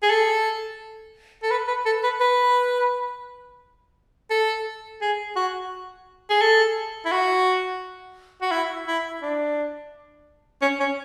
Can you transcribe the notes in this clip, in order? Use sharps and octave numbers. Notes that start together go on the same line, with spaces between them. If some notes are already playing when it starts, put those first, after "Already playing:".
G#4
A4
A4
B4
B4
A4
B4
B4
A4
G#4
F#4
G#4
A4
E4
F#4
F#4
E4
E4
D4
C#4
C#4